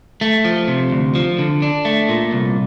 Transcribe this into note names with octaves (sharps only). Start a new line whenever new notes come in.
A3
F3
C3
D2
F3
D3
D4
A3
A#2
C2